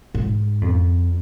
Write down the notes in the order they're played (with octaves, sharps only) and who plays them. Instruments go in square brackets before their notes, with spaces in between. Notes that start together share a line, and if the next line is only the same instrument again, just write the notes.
[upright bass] G#2
F2